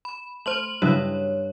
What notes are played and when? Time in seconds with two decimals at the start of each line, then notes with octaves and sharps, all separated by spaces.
0.05 B5
0.46 A3 C5 C6 F#7
0.82 G2 C#3 F#3 E4 C#5 D#5 E5